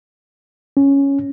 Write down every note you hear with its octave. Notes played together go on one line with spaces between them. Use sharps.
C#4